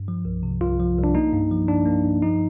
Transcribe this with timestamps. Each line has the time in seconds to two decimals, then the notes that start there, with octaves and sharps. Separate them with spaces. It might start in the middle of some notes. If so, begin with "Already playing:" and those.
Already playing: G2
0.08 F3
0.25 C2
0.43 C3
0.61 C2 F4
0.80 F3
0.98 C2
1.04 D4
1.15 A#3 D#4
1.33 G2
1.51 F3
1.68 G2 D4
1.86 A#3
2.04 G2
2.22 F3 D#4